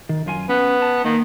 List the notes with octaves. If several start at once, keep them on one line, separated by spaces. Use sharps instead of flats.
D#3
F#2 F4 G#5
B3 C#4
A5
D#3 A#3